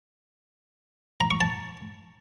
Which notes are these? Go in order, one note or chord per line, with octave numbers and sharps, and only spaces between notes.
A#5
C#6
A5